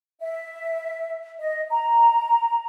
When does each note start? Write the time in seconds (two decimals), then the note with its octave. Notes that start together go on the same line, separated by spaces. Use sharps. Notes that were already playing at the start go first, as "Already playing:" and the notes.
0.21 E5
1.39 D#5
1.71 A#5